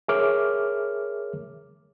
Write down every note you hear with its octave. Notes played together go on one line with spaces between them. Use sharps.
G#4 A#4 C#5 E5 D6 F6